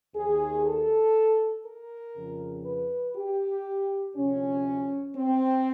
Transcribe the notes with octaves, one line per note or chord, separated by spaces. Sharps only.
D#2 D#3 G#4
A4
A#4
F2 C#3 F3
B4
G4
D2 C3 F3 C#4
C4